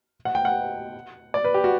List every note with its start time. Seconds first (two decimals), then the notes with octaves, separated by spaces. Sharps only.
0.25 F#5
0.35 G5
0.45 F#5
1.34 D5
1.44 B4
1.54 G4
1.64 F#4